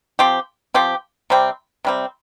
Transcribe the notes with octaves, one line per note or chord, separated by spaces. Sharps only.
F3 C4 G4
F3 C4 G4
C3 G3 C4
C3 G3 C4